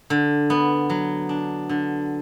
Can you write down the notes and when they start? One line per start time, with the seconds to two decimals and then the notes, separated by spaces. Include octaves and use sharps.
0.10 D3
0.50 B3
0.90 F#3
1.29 D4
1.69 D3